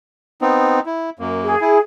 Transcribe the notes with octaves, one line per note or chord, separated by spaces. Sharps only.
B3 C4 D#4
E4
F#2 A#3
G#4
E4